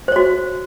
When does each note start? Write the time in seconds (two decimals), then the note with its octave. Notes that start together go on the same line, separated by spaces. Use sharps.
0.08 C5
0.12 C#5
0.16 F#4